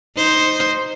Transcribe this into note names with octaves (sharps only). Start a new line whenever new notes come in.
D#4 C5